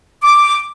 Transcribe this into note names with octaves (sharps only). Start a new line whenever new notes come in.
D6